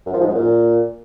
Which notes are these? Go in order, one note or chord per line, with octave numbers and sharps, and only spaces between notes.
F#2
F3
G#2
F#2
A#2